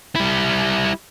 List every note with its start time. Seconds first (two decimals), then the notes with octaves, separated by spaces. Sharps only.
0.16 G3 E4